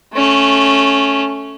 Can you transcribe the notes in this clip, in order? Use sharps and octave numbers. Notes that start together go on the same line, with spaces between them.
A3 C#4